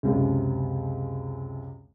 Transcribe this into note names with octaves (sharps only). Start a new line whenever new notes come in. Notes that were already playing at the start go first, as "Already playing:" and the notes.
C#2 F#2 C3